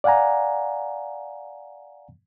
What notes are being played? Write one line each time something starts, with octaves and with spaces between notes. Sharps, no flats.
D5 F5 F#5 G#5 A#5